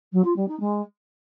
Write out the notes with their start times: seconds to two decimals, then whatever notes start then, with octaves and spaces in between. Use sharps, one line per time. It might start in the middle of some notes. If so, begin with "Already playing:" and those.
0.12 F#3
0.24 F4
0.36 G3
0.48 D#4
0.60 G#3